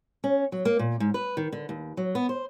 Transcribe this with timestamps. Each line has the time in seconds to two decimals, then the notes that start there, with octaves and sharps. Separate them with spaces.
0.24 C#4
0.52 F#3
0.65 A#3
0.79 A#2
1.00 G#2
1.14 B4
1.37 D#3
1.52 D3
1.69 D#2
1.97 F#3
2.15 B3
2.29 C5